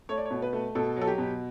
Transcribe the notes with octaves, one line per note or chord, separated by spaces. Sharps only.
A3 C#5
D5
C#5
B2
B4
A3
B2 A4
F#3
A4
G4
B2